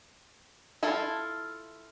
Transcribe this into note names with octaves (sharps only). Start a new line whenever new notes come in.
E4 F4 A4